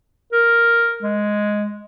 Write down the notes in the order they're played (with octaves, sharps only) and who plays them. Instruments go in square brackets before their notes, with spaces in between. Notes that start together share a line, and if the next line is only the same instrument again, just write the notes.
[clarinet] A#4
G#3